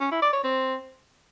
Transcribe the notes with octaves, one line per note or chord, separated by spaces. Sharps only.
C#4
E4
D5
C#5
C4